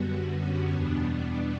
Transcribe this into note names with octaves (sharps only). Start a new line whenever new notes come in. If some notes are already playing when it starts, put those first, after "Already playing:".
Already playing: F#2 D3 G3 B3 F#4
C#4
E2 B2 G3 B3 D4